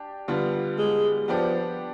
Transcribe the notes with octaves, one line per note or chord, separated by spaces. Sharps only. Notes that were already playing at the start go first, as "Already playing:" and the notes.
Already playing: D4 G4
D3 G3 B3 F4
G#3
F3 B3 D4 G4 D5